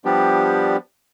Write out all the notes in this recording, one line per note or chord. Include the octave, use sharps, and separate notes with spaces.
F3 G3 B3 D4 G4